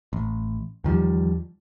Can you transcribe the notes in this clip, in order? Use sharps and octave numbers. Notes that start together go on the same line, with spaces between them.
A1
E2 D#3 F3 G3